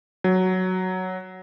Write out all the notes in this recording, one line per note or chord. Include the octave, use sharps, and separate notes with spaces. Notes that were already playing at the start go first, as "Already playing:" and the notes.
F#3